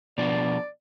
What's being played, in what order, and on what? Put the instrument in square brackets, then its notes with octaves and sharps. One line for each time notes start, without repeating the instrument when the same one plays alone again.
[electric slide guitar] B2 F3 D4 [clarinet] D5